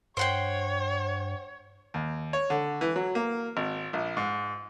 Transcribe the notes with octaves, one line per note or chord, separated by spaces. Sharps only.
G2 C5 C#5 F#5 G5
D#2
C#5
D3
E3
F#3
A#3
G#1
A#1
G#2